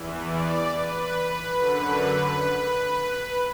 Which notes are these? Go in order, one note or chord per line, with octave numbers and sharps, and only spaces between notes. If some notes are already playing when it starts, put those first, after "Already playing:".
Already playing: E2 E3
D5
B4
F#2 D3 B4